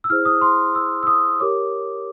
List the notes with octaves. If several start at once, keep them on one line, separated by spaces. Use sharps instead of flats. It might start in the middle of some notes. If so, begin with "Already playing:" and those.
E6
E4 G#4 C5 F6
D#6
C6
E6
E6
D#6
G4 A#4 C#5 D6